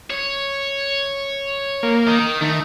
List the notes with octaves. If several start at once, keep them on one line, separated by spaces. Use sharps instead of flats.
C#5
A#3
D#3
D#3 A3